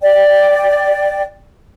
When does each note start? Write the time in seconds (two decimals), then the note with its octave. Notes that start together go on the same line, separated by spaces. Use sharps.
0.02 D5 G5